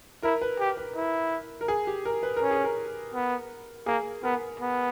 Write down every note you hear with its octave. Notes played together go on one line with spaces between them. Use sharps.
E4 A#4
B4
G4
B4
E4
A#4
G#4
G4
A#4
B4
A#4
C#4
G#4
A#4
B3
A#3 G#4
B3 A#4
B3